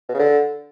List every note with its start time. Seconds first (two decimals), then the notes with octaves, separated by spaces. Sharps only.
0.09 B2
0.14 C#3
0.19 D3